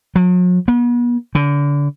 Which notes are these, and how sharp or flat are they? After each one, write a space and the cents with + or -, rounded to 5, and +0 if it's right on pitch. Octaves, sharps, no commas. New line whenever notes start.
F#3 -45
B3 -40
D3 -30